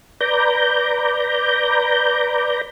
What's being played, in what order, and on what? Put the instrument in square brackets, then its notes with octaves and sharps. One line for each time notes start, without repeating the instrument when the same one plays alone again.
[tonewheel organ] B4 D5 A#5 G6